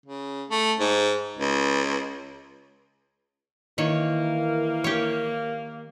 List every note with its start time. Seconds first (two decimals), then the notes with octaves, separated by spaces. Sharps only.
0.06 C#3
0.50 A3
0.79 G#2
1.38 C#2
3.78 D#3 E3 A#3 C#5
4.84 G4 C#5